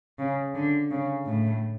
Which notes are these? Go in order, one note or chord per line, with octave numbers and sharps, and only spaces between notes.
C#3
D3
C#3
A2